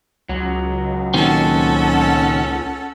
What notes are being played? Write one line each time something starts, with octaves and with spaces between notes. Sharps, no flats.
C#2 F#3
A#2 D#3 C4 C#4 A4 F#5